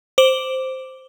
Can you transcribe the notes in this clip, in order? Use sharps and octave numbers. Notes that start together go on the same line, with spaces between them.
C5 D6 D7 F#7 G7